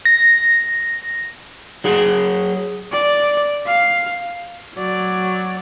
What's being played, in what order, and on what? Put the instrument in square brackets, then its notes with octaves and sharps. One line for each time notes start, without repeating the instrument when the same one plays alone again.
[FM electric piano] A#6
[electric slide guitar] F#3 G#4 F#5
[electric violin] D5
F5
[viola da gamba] F#3 D5